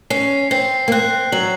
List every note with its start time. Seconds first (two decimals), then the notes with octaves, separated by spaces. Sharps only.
0.10 C#4 C7
0.51 C4 C7
0.88 A#3
0.92 C4 F#6
1.32 F#3 F#7